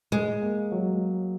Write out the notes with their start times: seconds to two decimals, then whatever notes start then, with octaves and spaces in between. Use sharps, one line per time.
0.12 G#3 G#4
0.42 A#3
0.72 F#3